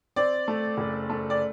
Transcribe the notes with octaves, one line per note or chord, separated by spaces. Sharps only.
C4 D5
A3
F#1
A3
D5